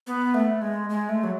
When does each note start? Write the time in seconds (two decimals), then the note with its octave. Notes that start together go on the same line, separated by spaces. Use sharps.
0.07 B3
0.34 A3
0.62 G#3
0.89 G#3
1.09 A3
1.24 F#3